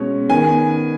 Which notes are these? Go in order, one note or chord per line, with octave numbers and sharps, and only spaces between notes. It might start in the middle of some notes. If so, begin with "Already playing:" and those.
Already playing: B2 G#3 C#4
D#3 B3 G#5